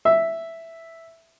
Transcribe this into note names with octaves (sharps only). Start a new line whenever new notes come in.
E5